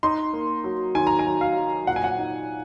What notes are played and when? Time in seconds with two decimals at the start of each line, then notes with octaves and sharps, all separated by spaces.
0.03 D#4 C6
0.33 A#3
0.64 F#3
0.95 D#3 G#5
1.07 A#5
1.19 G#5
1.26 F#3
1.41 F5
1.56 F#3
1.87 A#2 F#5
1.96 G#5
2.04 F#5
2.19 D#4